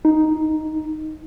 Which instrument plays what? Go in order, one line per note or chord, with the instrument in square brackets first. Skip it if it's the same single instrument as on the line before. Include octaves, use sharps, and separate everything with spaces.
[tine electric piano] D#4